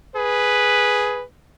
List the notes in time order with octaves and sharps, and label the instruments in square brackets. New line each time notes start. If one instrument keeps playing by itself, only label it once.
[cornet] G#4 [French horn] B4